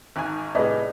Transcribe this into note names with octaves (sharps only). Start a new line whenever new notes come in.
G#1 D#3 G#5 F#6
A2 C3 G3 G#4 B4 D5 D#5